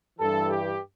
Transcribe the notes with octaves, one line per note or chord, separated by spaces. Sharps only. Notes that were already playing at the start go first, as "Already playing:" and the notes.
G2 E3 A4
G4